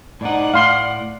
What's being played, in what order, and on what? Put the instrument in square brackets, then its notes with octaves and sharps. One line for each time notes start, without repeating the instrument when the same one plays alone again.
[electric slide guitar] A2 D#4 [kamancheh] D5 F#5
[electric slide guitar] A2 [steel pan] F5 C6